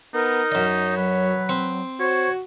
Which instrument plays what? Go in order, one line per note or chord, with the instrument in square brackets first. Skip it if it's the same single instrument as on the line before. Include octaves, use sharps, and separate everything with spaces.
[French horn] B3 [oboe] D#4 [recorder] A#4
[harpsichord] F#2 D#5 [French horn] C#5
[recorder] F#3 [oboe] B4
[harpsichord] C4
[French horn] F#4 [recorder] C5 [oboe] C#5